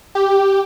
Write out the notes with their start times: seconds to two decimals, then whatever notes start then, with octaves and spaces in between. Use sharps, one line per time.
0.15 G4